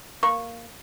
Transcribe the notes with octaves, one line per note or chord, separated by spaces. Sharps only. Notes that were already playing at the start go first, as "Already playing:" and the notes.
A#3 C#6